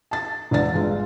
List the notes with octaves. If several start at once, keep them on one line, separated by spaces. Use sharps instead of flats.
A5 A6
E1 D3 D4 A6
G1 G#3 F4